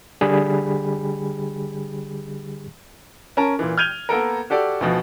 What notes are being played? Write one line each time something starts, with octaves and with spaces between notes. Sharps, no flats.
D3 G3 G4 G#4 B5
C#4 A#4 A5
A#2 E3
F6 G6 G#6 D#7 F7 G7
A#3 B3 A4 A#4
F#4 G4 A4 D5
D2 B2 F3